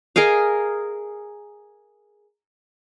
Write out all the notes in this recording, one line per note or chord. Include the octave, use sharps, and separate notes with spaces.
G#4 A#4 D#5 F5